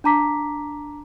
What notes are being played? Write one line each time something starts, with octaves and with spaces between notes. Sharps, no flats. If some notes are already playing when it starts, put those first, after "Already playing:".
D4 A5 A#5 D6 B6